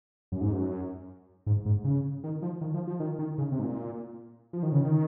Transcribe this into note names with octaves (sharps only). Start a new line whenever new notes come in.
F#2
G#2
F#2
G#2
G#2
C#3
D#3
F3
D#3
F3
F3
D#3
D#3
C#3
C3
G#2
A#2
F3
D#3
C#3
D#3